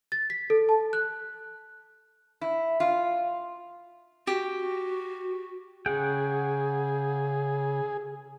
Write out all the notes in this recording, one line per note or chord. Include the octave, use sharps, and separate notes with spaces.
A6
B6
A4
A5
F#6
E4
F4
F#4 G4
C#3 G#4 F#5 G5